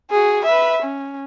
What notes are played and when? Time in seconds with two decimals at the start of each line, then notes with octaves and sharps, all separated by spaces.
0.11 F#4 G#4
0.45 B4 E5
0.82 C#4